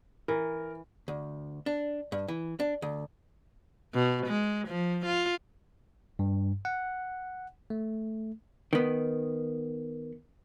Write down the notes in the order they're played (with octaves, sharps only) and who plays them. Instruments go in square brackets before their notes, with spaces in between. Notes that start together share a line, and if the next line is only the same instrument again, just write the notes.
[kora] E3 [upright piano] A#4
[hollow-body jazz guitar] D2
D4
G2
E3
D4
D2
[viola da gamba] B2
G#3
F3
F4
[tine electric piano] G2
F#5
A3
[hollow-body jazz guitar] D#3 B3